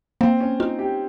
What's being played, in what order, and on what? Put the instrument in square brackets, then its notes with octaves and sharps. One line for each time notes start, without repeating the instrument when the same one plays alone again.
[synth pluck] A#3 [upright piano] C4
[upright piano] C#4
[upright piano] D#4 [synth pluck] F4
[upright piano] G4